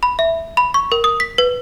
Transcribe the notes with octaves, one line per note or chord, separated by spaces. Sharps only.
B5
E5
B5
C#6
A#4
D#6
B6
B4